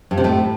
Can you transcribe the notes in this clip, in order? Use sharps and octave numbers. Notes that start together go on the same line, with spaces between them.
G2
C3
A2